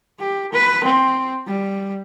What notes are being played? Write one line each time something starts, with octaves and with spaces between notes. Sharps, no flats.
G4
B4
C4
G3